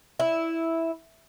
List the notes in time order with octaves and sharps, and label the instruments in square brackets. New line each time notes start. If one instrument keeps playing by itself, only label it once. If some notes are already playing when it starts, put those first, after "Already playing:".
[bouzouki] E4